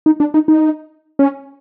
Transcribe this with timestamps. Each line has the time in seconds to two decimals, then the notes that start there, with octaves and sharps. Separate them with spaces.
0.06 D#4
0.20 D4
0.34 D#4
0.48 D#4
1.19 C#4